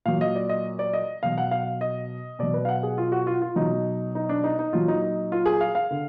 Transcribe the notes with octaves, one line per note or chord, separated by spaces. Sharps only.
A#2 F#3 F5
D#5
D5
D#5
D5
D#5
B2 F#3 F5
F#5
F5
D#5
B2 F#3 D5
B4
F5
F#5
G#4
F4
F#4
F4
F4
B2 F#3 D#4
D#4
D4
D#4
D#4
A#2 F#3 F4
D#4
D#4
F4
G#4
F5
F5
D3